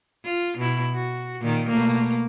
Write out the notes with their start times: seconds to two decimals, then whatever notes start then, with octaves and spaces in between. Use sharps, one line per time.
0.25 F4
0.58 B2 E4
0.94 F#4
1.41 A#2 D#3
1.69 B2 A3 A#3